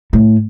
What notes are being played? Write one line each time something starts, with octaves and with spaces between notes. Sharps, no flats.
A2